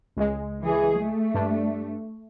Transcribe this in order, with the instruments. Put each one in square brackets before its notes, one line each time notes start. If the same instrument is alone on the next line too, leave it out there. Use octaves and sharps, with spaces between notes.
[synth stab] C#2 G#3
[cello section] E3 G#4
A3
[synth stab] G2 D4